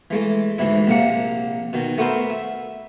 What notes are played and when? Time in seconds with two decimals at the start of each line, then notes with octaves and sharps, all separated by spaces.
0.10 E3 G#3 A3
0.59 D2 G#2 E3 E4
0.87 A#1 C3 A#3 F#5
1.73 B2 D#3
1.98 A3 B3 F#4 A#4 C5 E5
2.30 E5